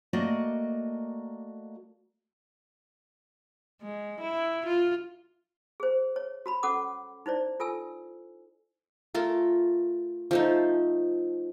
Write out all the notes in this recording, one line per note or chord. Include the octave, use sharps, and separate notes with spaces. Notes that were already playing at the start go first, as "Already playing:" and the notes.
A3 A#3 F#4 D5 D#5
G#3
E4
F4
G#4 C5
C#5
F#4 A#5 B5
C#4 A4 F#5 D6 D#6
D#4 E4 C5 D5
F4 A4 G#5 E6
A3 F4 A#4
F3 A3 D#4